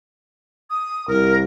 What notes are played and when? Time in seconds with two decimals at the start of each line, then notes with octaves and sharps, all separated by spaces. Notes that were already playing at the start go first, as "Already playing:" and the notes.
0.70 D#6
1.08 C2 A#4